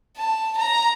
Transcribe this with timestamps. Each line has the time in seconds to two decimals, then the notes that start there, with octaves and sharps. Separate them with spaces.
0.17 A5
0.57 A#5